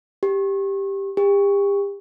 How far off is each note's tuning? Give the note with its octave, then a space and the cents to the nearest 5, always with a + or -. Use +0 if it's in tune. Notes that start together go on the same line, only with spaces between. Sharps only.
G4 +5
G4 +35